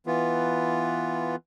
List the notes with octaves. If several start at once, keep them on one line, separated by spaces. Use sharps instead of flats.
E3 B3 F4